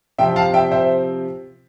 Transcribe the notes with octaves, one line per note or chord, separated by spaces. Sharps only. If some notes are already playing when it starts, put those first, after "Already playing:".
C3 F3 C4 E5 G5
F5 A5
E5 G5
C5 E5